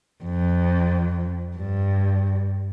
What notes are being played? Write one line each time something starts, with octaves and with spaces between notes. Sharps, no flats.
F2
G2